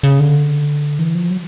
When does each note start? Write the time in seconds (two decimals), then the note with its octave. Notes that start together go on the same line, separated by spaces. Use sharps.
0.03 C#3
0.20 D3
0.99 E3
1.15 F3
1.31 F#3